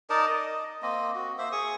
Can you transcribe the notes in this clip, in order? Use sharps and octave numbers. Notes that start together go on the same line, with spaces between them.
D#4 A#4 D5 A5
D#5
A#3 C4 D#5
F#4
A#3 C5 E5
G#4 C#6 D#6